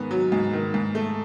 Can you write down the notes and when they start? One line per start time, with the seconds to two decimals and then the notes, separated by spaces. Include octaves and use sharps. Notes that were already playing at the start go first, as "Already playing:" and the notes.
Already playing: G#2 D#3 B3
0.11 F#3
0.32 G#2
0.53 D#3
0.74 G#2
0.95 A3